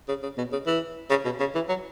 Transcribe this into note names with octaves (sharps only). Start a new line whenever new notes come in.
C#3
C#3
B2
C#3
E3
C#3
B2
C#3
E3
F#3